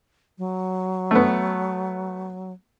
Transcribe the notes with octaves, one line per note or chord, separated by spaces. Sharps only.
F#3
A3 B3